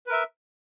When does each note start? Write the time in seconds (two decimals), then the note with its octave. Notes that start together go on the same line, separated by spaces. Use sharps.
0.06 B4
0.09 A#4
0.12 E5